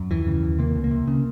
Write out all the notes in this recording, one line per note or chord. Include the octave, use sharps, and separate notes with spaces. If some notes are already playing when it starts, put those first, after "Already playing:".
Already playing: F#2
D#2 E3
C#3
D#2
C3 A#3
C#2
A#3
C3
C#3